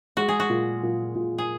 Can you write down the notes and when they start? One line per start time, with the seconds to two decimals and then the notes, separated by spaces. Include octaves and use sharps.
0.17 G#3 F#4
0.29 G#4
0.40 F#4
0.50 A#2
0.83 A#2
1.15 A#2
1.38 G#4